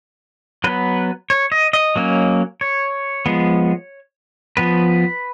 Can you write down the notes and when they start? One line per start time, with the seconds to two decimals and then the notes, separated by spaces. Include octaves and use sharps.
0.64 F#3 B3 B4
1.30 C#5
1.52 D#5
1.73 D#5
1.96 F#3 A#3 C#4
2.61 C#5
3.26 F3 G#3 B3
4.57 F3 B3 B4